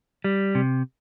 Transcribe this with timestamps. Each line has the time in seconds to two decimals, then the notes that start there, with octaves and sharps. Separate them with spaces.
0.24 G3
0.55 C3